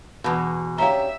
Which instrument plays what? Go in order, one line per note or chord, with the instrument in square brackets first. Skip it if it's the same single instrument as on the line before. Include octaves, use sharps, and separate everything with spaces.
[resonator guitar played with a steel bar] E2 B2 [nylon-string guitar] F#4 B4
[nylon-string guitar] D2 C#4 G4 [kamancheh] E5 [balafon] F5 A#5